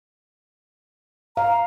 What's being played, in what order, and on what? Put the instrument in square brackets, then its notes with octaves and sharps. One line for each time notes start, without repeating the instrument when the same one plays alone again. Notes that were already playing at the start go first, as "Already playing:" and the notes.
[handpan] F5 [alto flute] A#5